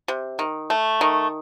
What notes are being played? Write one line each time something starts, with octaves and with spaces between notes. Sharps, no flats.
C3
D#3
A3
D#3